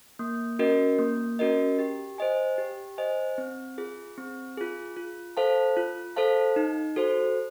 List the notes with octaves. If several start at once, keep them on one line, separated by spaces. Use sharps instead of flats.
A#3
C#4 F#4 A#4 D#5
A#3
C#4 F#4 A#4 D#5
G4
C5 D#5 G#5
G4
C5 D#5 G#5
C4
F4 G#4
C4
F4 G#4
F4
A4 C5 F5 A5
F4
A4 C5 F5 A5
D#4
F#4 A4 C5